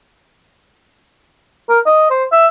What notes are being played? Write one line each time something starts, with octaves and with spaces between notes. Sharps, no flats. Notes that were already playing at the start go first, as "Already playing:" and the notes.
A#4
D#5
C5
E5